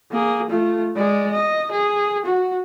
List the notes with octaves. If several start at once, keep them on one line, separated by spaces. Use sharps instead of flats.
A#3 G#4
A3 F4
G#3 D5
D#5
G#4
F#4